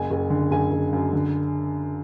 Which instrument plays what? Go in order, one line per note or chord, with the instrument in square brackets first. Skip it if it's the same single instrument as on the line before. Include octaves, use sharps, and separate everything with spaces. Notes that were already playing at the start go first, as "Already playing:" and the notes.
Already playing: [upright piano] F#1 G#5
F#1
D3
F#1 G#5
F#1
F#2
D3